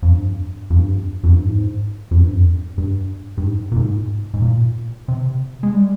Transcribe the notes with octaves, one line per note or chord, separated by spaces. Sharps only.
F2
G2
F2
G2
F2
G2
G#2
F2
G2
F2
G2
G2
G#2
A#2
G#2
G#2
A#2
C3
G#3
G3